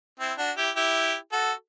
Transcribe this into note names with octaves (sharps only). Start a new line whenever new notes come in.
C4 E4
D4 F#4
E4 G4
E4 G4
F#4 A4